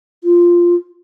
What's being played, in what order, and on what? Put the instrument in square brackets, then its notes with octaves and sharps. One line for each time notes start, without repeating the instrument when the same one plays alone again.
[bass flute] F4